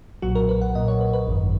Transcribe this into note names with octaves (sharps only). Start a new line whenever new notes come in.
B1 A#2 F#3 F#4
A#4
B4
F#5
B1 A#2 F#3 D#5
C#5
B4
B4
G#1 F#2 D#3